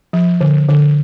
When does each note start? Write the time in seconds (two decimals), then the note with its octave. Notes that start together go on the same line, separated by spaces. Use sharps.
0.13 F3
0.41 D3
0.69 D3